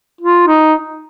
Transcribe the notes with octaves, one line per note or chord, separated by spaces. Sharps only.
F4
D#4